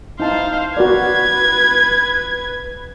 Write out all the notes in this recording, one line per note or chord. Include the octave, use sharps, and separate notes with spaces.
D#4 E4 C5 F5 A5
F#4 A#4 B4 D5 G#6